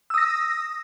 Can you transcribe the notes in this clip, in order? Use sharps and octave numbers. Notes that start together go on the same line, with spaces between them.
D#6 E6 A#6